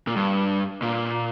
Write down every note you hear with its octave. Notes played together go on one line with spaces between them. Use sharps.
A#2
G2
A#2